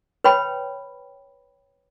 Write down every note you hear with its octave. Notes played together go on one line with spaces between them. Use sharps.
B4 C#5 G5 B5